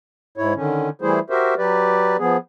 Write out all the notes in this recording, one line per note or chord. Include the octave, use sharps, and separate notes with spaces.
G#2 E4 C#5
D3 D#3 C#4
E3 G3 A3 E4 G#4 C5
F#4 G4 A#4 C5 E5
F#3 G4 B4 D5
F3 B3 G#4